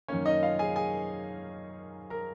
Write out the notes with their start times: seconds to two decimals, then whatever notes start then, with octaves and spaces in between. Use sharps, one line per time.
0.08 F#2 D#3 A#3 C#4 C#5
0.25 D#4 D#5
0.42 F4 F5
0.59 G#4 G#5
0.76 G#4 G#5
2.10 A#4 A#5